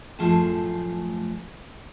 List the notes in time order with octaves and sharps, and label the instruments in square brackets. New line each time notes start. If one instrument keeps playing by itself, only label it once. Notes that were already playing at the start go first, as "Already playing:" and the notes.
[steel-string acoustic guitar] F#2 A2 F3 A3 G#4 A5